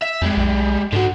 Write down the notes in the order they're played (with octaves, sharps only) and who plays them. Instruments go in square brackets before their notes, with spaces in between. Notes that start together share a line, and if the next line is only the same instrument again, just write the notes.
[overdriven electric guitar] E5
[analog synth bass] F2 [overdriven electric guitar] G3 G#3
[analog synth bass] B1
[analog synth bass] G#2 [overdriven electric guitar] D3 F#4